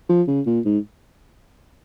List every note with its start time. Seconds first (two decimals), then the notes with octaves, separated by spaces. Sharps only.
0.09 F3
0.28 C#3
0.47 A#2
0.65 G#2